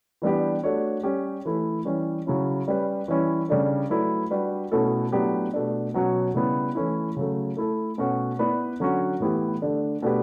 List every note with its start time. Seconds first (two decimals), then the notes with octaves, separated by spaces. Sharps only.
0.22 E3 G3 B3 D4 G4
0.63 A3 D4 F#4 C#5
1.03 G3 C#4 G4
1.45 E3 A3 E4 B4
1.85 E3 G3 C#4
2.27 C#3 F#3 C#4 E4
2.68 G3 C#4 G4 B4
3.08 E3 G3 C#4 E4
3.49 C#3 G3 D4 A4 C#5
3.89 F#3 A3 E4 B4 D5
4.31 G3 D4 F#4 B4
4.72 B2 A3 C#4 E4 A4
5.12 A2 F#3 B3 D4 G4
5.54 B2 A3 D4
5.94 B2 F#3 C#4 F#4 C#5
6.34 C#3 G3 B3 E4
6.75 E3 A3 C#4 E4
7.17 C#3 F#3 A3
7.57 A3 E4 A4
7.98 B2 A3 C#4 F#4
8.39 B3 E4 B4 D5
8.80 D3 F#3 C#4 F#4
9.20 A2 E3 B3 E4 G4
9.62 D3 A3 D4
10.02 B2 A3 D4 G4 B4